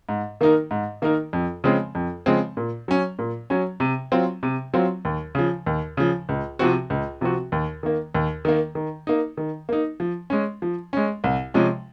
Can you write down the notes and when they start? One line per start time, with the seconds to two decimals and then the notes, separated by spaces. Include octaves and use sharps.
0.09 G#2
0.41 D#3 A#3 D#4 A#4
0.71 G#2
1.02 D#3 A#3 D#4 A#4
1.33 F2
1.64 C#3 F3 G#3 C4
1.95 F2
2.26 C#3 F3 G#3 C4
2.57 A#2
2.88 F#3 C#4
3.19 A#2
3.50 F#3 C#4
3.80 C3
4.12 F#3 C4 F4
4.43 C3
4.74 F#3 C4 F4
5.05 D#2
5.35 C#3 F3
5.66 D#2
5.97 C#3 F3
6.29 C#2
6.59 C3 F3 C4 F#4
6.90 C#2
7.21 C3 F3 C4 F#4
7.52 D#2
7.83 D#3 A#3
8.15 D#2
8.45 D#3 A#3
8.75 D#3
9.07 A#3 D#4
9.37 D#3
9.69 A#3 D#4
10.00 F3
10.30 G#3 C#4
10.62 F3
10.93 G#3 C#4
11.24 C2
11.54 C3 F3 G#3 C#4